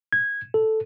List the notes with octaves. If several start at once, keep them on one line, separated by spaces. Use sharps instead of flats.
G#6
A4